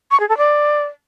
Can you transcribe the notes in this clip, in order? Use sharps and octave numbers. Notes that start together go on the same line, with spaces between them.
C#6
G#4
A4
D5